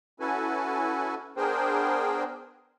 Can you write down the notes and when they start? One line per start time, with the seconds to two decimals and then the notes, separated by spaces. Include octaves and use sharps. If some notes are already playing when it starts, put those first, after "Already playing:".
0.20 C#4 E4 F#4 A4 B4 G#5
1.37 B3 D4 G#4 A#4 C5 G5